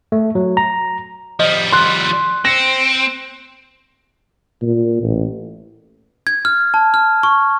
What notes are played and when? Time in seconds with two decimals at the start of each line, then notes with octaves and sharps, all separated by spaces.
0.12 A3
0.35 F#3
0.57 A#5
1.40 F3 G3 D#5
1.73 C6 F#6
2.45 C4 A#6 C#7
4.62 A#2
5.03 A1
6.27 G#6
6.45 F6
6.74 A5
6.94 F6
7.23 C#6